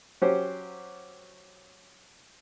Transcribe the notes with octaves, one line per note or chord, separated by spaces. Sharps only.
F#3 C#4 G4 C5